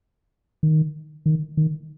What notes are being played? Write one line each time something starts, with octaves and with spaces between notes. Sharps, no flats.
D#3
D#3
D#3